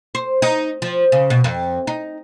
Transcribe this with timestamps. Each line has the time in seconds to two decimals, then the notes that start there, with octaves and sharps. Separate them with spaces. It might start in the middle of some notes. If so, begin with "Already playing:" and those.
0.15 C5
0.42 D#4
0.82 F3
1.12 C#3
1.30 B2
1.44 F2
1.87 D#4